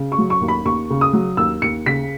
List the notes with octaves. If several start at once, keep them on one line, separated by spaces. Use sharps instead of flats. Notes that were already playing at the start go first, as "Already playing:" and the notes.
Already playing: C#3
C#6
F#3
C#6
D#2
B5
D#2 C#6
C#3
D#6
F#3
D#2 E6
D#2 C#7
C#3 B6